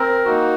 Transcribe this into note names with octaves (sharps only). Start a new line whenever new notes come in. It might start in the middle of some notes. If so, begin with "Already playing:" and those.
Already playing: C4 A#4
A#3 D#4 F#4